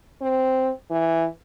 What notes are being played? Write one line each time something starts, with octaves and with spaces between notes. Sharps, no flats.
C4
E3